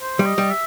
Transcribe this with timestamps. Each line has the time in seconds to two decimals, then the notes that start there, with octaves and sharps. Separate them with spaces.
0.01 C5
0.19 G3
0.26 D#5
0.38 G3
0.50 E5